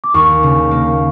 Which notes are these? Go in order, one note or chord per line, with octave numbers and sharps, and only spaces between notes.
D6
D#2 C#6
C#3
A#3